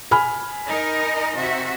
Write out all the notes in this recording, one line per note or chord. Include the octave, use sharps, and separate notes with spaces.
G#5 B5 F6
D#4 A#4 D#5
C3 F#4 E5